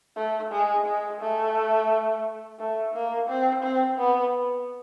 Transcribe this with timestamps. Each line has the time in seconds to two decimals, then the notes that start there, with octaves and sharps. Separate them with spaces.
0.16 A3
0.52 G#3
0.86 G#3
1.21 A3
2.59 A3
2.94 A#3
3.28 C4
3.63 C4
3.98 B3